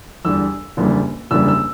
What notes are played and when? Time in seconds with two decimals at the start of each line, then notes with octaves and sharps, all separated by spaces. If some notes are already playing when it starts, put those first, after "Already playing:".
0.25 E2 D3 G3 E6
0.77 F#1 E2 D3 G3
1.31 F#1 E2 D3 G3 E6
1.48 E6